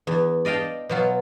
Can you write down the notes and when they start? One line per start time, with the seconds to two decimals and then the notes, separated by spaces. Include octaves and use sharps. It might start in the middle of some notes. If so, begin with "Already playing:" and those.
0.07 E2
0.45 D5 D#5 F5 G5 A5
0.89 B2 F#3 F4